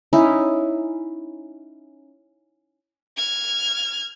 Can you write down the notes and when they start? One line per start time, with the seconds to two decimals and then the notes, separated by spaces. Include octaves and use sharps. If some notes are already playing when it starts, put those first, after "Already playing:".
0.13 C#4 D#4 E4
3.17 F6 G#6